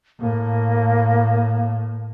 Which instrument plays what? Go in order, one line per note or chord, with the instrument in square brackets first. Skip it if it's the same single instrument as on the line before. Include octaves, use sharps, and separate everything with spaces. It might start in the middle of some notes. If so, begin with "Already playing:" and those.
[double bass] A2 [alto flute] A#3